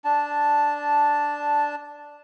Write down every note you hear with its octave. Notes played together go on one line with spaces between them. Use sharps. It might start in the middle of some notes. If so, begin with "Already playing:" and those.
D4 A5